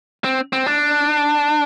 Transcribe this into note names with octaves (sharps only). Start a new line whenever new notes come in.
C4
C4
D4